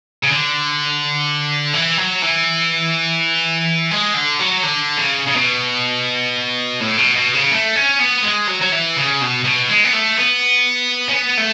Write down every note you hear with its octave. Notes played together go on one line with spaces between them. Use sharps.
C#3
D3
E3
F#3
E3
G#3
D3
F#3
D3
C#3
C#3
B2
A2
B2
B2
C#3
A3
C#4
B3
G#3
F#3
F#3
E3
C#3
B2
B2
G#3
B3
A3
B3
C#4
B3
A3